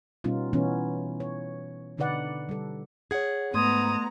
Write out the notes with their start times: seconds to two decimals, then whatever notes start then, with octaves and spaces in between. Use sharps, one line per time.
0.24 B2 G3 B3 C#4 D#4 F4
0.53 B2 E3 B3 C#4 D#4
1.20 C#5
1.98 B2 D3 D#4 B4 D5 F#5
2.49 G3 A4
3.11 G#4 C#5 F#5 G#6
3.54 G#2 A3 B3 A#5 C6 D#6 G#6